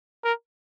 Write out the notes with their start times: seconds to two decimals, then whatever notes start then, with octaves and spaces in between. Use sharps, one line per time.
0.24 A#4